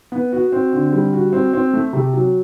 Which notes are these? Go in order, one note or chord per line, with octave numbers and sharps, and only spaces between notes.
B3
F#4
C4
D3
G3
F#4
C4
C4
A3
C3
F#3